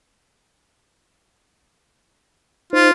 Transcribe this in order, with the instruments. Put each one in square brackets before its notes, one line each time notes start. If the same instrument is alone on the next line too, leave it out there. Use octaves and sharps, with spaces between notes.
[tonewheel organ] D#4 C5 [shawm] F4